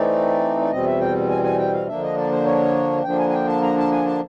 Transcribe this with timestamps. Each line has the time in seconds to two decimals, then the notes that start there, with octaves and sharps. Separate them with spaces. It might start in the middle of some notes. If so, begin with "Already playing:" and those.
Already playing: E3 A3 C4 D#4 D5
0.61 D5
0.71 E2 B2 G3 C4 D#5
0.86 E5
1.00 G5
1.29 G#5
1.44 G#5
1.59 G5
1.73 F5
1.87 D3 F3 A#3 D4 E5
2.02 D#5
2.17 D5
2.32 C5
2.45 C#5
3.04 D3 F3 A#3 D4 G5
3.19 G#5
3.29 G#5
3.33 G5
3.48 A5
3.62 A#5
3.77 A5
3.91 G#5
4.06 A5